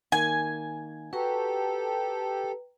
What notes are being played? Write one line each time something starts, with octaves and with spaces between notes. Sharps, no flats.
D#3 A#3 G#5
F#4 G4 A4 B4 G5 A#5